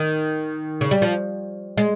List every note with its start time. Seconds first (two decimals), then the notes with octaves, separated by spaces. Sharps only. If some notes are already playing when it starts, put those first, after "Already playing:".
Already playing: D#3
0.81 C#3
0.91 G3
1.02 F3
1.78 G#3